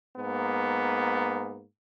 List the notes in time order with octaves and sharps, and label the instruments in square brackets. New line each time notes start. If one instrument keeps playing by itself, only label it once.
[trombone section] G#2 A#3 B3